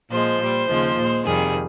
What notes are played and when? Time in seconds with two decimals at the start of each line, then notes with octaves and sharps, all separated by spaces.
0.10 A#2 F3 G#3 C5
0.40 A#2 G3
0.68 D#2 C#3 F3 G#3
0.97 A#2 G#3
1.25 F2 C3 D#3 G3 G#4